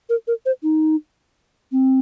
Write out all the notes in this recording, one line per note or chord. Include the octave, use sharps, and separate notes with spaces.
A#4
A#4
C5
D#4
C4